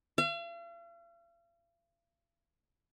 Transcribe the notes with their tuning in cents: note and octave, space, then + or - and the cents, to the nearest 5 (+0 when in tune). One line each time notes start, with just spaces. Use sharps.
F5 -45